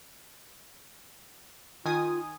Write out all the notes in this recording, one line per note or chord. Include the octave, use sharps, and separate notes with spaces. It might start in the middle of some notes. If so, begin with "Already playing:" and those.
D#3 F4 G#5 D#6